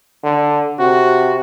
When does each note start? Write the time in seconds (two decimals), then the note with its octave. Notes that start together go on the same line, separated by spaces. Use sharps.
0.24 D3
0.79 C3 F#4